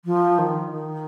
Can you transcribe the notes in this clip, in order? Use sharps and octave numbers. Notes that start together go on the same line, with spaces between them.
F3
D#3
D#3